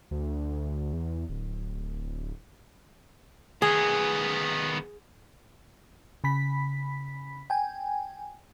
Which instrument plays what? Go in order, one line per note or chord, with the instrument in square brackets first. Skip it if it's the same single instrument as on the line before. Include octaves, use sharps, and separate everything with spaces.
[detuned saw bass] D2
E2
D1
[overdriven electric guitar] D#3 B3 [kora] G#4
[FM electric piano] C#3 B5 B6
G5 G#5